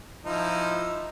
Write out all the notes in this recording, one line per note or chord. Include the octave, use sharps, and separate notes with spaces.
F3 D#4 E4